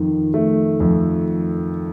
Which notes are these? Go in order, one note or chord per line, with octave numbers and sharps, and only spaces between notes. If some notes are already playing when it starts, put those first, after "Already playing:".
Already playing: F2 D#3
A3
F2